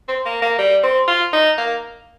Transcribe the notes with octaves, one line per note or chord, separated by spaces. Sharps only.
C4
A#3
A#3
G3
C4
F4
D#4
A#3